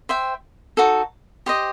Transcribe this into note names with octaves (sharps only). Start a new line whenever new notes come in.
C5 E5 G5
D#4 F#4 A4
G4 C5 D#5